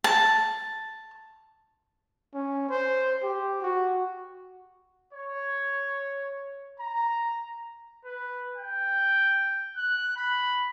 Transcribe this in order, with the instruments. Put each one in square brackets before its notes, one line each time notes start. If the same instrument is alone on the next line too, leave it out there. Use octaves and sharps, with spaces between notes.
[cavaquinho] A5
[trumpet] C#4
C5
G4
F#4
[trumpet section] C#5
A#5
[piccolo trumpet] B4
G5
F#6
B5